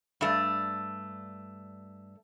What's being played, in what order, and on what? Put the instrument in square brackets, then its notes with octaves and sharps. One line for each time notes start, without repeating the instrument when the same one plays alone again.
[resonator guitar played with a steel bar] G2 A3